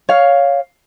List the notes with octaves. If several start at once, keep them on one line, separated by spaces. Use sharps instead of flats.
C#5 F5